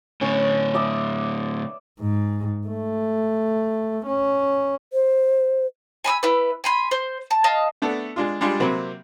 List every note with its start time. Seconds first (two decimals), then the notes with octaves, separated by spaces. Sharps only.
0.21 A2 D3 C#4 B4
0.74 D5 E5 D#6
2.00 G#2
2.67 A3
4.06 C#4
4.93 C5
6.04 G#5 B5 D6 E6
6.23 E4 B4
6.64 G#5 B5 C6
6.91 C5
7.31 A5
7.44 D#5 F5 A5
7.82 A3 B3 D4 A4
8.16 G#3 D4 F4
8.41 G3 G#3 D4 F4
8.60 C3 F#3 A#3 C4 B5